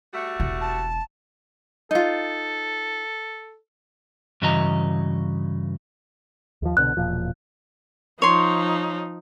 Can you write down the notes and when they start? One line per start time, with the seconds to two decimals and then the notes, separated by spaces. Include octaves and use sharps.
0.13 G3 A3 F#4
0.40 E1 E4
0.61 A5
1.91 D#4 F4 A4
4.42 G2 C#3 E3 F#4 D#5 A#5
6.62 D#2 F3
6.77 C2 B2 D3 F#6
6.97 E1 A#2 F3
8.22 F3 D#4 C#5 C6